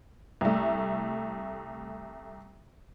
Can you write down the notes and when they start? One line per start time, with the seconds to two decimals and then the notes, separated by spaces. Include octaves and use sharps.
0.41 C2 A3